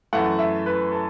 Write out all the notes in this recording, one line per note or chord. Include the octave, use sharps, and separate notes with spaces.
F#2 E3 A3 F#5
E5
B4
A4